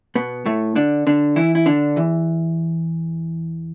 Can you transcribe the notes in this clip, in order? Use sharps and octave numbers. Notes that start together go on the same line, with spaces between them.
B2 B3
A2 A3
D3 D4
D3 D4
E3 E4
E4
D3 D4
E2 E3